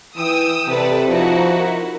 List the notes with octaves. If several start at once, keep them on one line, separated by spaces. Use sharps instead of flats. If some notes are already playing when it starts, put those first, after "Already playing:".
E3 G5 D#6 E6
C3 A4 B4 D5
F3 D#4 E4 F#4
A#4